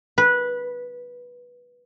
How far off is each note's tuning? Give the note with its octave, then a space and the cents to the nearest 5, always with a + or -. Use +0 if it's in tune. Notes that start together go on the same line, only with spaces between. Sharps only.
B4 -15